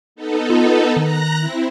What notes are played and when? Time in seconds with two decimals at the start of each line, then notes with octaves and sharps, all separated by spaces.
0.16 B3 D#4 A4
0.50 F4
0.96 D#3 A#5 F#6 A#6
1.39 C4 E4